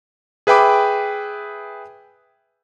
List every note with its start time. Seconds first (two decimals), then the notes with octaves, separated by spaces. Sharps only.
0.47 G#4 B4 E5 G5 B5 D6